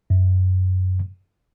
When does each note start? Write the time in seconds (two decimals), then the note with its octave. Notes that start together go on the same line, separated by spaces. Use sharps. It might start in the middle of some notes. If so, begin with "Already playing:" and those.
0.10 F#2